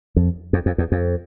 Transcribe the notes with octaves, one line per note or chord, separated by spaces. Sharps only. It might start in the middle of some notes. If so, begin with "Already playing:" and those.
F2
F2
F2
E2
F2